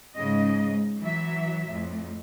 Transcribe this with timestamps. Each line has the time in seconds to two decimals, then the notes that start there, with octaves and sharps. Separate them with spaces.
0.15 G#2 C#3 D#5
1.00 E3 F#3 E5
1.67 F2 A2